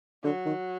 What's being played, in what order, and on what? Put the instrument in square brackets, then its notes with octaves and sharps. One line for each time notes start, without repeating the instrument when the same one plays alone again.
[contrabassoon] D3 [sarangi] F#3
[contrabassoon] D#3